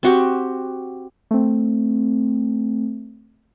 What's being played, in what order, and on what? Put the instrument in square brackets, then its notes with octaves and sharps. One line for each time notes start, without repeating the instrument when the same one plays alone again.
[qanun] C4 F#4 G4
[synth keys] A3 C4